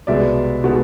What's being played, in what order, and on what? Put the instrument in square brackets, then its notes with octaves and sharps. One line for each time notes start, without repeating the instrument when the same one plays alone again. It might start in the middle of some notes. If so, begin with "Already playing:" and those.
[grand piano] C2 B2 G#3 B3 D5 E5
B2 G#3 B3